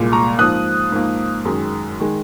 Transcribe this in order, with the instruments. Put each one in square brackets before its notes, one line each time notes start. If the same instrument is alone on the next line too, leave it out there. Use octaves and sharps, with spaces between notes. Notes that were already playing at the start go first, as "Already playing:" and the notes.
Already playing: [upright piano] C2 A#2 G#3
A#5 C#6
G#2 F3 A#3 D#6 F#6
G#2 F3 A#3
F#2 D#3 G#3
D#3 G#3